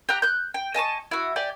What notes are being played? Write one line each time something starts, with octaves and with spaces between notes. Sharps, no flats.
G4 G5 A#5 F#6
F#6 G6
G5
D#5 G#5 A5 C#6
E4 F#4
G4 D5 G#5